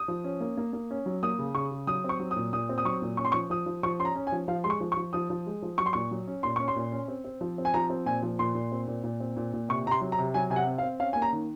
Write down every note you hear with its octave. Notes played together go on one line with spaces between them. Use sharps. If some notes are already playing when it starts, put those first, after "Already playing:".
Already playing: D#6
F3
C#4
A#3
A#3
A#3
C#4
F#3
A#3 D#6
C#3
C#3 C#6
C#3
F#3 D#6
C4
C#6
F#3
D#6
A#2
A#2 D#6
C4
D#6
F#3 C#6
A#2
C#4 C#6
C6
F3 C#6
F3 D#6
F3
F3 C#6
C#4 C6
A#5
C#4
G#5
F3
F3 F5
G#3 C6
C#6
F3
C#6
F3
F3 D#6
F3
G#3
F3
F#3 C#6
C6
A#2 C#6
F#3
C#4
A#2 C6
C#4 C#6
C6
A#2
C#4
C4
C4
F3
C4
G#5
F3 A#5
C4
A#2 G#5
F3
A#2 C6
A#2
C4
A#2
A#2
C4
A#2
A#2
C3 C#6
C3 A#5
C6
F#3
A#5
C3
F#3 G#5
C3 G#5
F#5
C4
F5
C4
C#4 F5
A#3 G#5
A#5
D#3